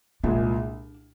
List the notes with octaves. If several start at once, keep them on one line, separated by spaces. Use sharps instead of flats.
C2 A#2 G#3 D4